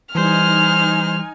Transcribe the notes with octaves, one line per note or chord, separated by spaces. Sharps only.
E3 G3 D#4 C5 G#5 F6